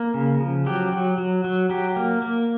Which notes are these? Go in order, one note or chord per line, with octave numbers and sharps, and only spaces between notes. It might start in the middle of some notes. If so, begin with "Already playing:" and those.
Already playing: A#3
C#3
F3
F#3 G4
F#3
F#3
F#3
F#3 G4
A#3
A#3